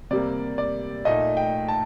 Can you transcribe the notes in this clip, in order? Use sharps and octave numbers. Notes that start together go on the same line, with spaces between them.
C3 G3 A#3 D5
D5
A#2 A3 D#4 D#5
G5
A5